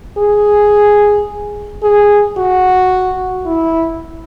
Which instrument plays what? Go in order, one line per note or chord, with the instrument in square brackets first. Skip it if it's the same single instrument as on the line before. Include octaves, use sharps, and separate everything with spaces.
[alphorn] G#4
G#4
F#4
E4